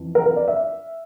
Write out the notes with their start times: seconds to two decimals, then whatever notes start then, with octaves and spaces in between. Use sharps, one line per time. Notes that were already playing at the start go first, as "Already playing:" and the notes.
Already playing: F2 E3
0.15 A#4
0.26 A#4
0.36 D5
0.48 E5